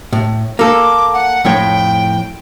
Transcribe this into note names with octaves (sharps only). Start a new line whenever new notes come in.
A2
A#3 A4 D6
F#5
F2 A2 C#5 G5